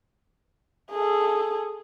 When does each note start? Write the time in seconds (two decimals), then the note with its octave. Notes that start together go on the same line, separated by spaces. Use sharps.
0.92 G#4 A4